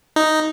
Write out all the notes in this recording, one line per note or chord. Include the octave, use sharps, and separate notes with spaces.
D#4